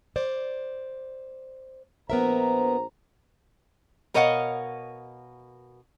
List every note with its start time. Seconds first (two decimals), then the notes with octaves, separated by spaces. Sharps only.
0.16 C5 D5
2.10 A#1 B3 A#4 C5 E5 A#5
4.14 B2 A#4 C#5 D#5 F5 F#5